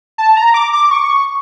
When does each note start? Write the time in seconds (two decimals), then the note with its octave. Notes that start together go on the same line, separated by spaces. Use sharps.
0.18 A5
0.37 A#5
0.54 D6
0.73 D6
0.91 C#6